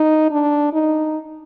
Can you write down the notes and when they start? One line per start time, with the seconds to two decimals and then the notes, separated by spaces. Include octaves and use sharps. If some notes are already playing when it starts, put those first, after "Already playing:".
Already playing: D#4
0.31 D4
0.73 D#4